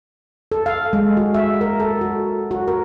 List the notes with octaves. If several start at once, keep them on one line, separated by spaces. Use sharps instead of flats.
A4
F5
G#3
F#4
E5
A#4
A4
F#4
F#4
A#4